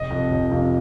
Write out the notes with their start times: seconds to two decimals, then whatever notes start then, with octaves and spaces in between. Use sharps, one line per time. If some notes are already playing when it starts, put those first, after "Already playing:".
Already playing: F1 D#5
0.11 F2 C3 F3
0.32 F1
0.51 F2 C3 F3